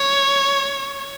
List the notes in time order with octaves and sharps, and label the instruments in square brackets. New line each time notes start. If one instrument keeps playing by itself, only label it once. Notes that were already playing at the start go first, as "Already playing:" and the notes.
Already playing: [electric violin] C#5